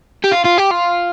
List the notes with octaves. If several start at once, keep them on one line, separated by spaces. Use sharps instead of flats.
G4
F4
F4
G4
F4